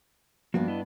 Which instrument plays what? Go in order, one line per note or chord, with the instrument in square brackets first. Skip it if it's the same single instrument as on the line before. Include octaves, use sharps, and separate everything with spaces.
[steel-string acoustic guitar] G2 B3 D4 [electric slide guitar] F3 A#3 F#4
[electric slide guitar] E4 D#5